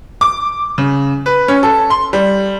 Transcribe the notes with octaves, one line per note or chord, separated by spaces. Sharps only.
D6
C#3
B4
C#4
A4
C6
G3